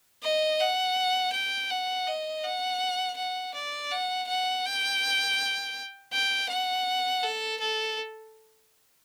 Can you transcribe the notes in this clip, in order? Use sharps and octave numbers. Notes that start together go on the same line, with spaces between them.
D#5
F#5
G5
F#5
D#5
F#5
F#5
D5
F#5
F#5
G5
G5
F#5
A4
A4